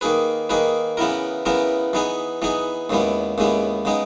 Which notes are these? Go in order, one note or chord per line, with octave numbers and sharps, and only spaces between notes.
D#3 A#3 D#4 G#4 B4
D#3 A#3 D#4 G#4 B4
C#3 E3 B3 E4 A#4
C#3 E3 B3 E4 A#4
E3 B3 D#4 G#4
E3 B3 D#4 G#4
D#2 C#3 G#3 B3 E4
D#2 C#3 G#3 B3 E4
C#3 G#3 B3 D#4